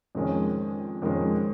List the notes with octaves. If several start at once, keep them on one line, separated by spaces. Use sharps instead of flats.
F2 D#3 G#3 C#4
F2 D#3 G#3 C#4